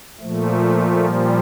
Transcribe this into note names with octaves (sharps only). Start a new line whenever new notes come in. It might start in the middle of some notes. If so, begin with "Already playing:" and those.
A#2 F3 A3
G3